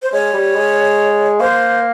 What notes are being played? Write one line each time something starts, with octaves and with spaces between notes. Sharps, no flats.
C5
G#3 C#5
G3
G#3
A#3 C5